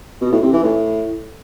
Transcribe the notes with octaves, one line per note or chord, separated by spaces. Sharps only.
B2
A2
C3
E3
A2